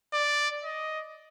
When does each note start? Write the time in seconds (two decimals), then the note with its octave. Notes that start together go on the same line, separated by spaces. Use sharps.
0.13 D5
0.64 D#5